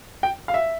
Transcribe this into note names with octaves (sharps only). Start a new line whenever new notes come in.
G5
F5
E5